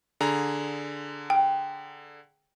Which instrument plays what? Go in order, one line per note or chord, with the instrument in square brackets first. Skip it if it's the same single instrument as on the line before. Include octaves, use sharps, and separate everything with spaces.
[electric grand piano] D3 G#4 A#5
[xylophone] G5